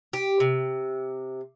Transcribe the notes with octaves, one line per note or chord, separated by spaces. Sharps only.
G4
C3